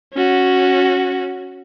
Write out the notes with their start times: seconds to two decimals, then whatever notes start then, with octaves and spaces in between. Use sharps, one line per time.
0.14 C#4 F#4